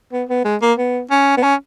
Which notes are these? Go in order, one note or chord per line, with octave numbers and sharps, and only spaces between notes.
B3
B3
G#3
A#3
B3
C#4
B3
C#4